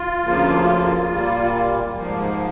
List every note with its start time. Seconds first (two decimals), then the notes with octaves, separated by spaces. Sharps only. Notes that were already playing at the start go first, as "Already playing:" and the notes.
Already playing: F4
0.24 D2 C#3 F3 A#3
1.11 A#2 G3 A#3
1.96 G#2 F3 A#3